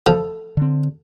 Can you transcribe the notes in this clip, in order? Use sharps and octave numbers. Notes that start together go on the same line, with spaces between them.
F3 A4
D3 C4